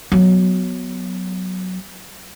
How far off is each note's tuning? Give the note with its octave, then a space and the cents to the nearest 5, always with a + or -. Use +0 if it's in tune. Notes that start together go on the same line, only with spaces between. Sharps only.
F#3 +0 B3 +0